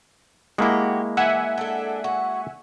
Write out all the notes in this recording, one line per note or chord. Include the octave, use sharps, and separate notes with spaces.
G#3 A#3 E4 F#4 G4
E3 E5 F#5 G#5
D4 A4
F#4